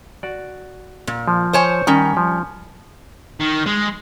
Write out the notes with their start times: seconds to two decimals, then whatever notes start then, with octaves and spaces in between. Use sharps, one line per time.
0.23 F#4 D5
1.07 A#2
1.28 F3
1.53 C5 C#5 G#5
1.87 D#3 G3 C#4
2.17 F3
3.40 D#3
3.66 G#3